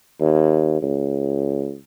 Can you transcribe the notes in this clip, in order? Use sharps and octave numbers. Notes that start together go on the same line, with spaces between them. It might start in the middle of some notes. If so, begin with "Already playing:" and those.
D#2
C#2